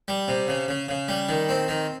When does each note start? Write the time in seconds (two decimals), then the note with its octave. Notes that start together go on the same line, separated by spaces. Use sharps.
0.08 G3
0.28 C3
0.48 C#3
0.68 C#3
0.88 C#3
1.08 G3
1.29 D#3
1.49 C4
1.68 D#3